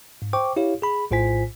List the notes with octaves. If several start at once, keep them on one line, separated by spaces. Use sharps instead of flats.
G#2
C5 G5 C#6 D6
E4 G4 C#5 F5
G#4 B5
A#1 A2 F4 C5 G#5 B6